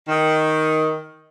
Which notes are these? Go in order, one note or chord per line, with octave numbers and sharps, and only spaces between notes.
D#3